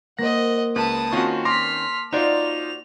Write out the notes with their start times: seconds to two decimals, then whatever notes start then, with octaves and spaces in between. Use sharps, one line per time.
0.19 A#3 C5 D#5 F#5 A#6
0.76 C#2 B4 A5 D#6
1.13 D#3 C4 C#4 F4 F#4
1.45 A5 C6 D6 F6 A#6 B6
2.13 D#4 F4 F#4 C5 D5 F7